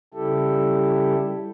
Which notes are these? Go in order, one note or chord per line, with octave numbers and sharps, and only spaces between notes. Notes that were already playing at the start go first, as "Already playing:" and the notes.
C#3 G3 E4 G4 A4